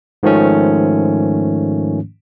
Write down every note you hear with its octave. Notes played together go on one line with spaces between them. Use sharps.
G#2 D#3 F3 A3 C#4